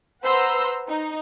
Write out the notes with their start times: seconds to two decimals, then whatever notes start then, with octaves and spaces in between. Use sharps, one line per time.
0.23 B4 C5 F#5 A#5 C6 E6
0.89 D#4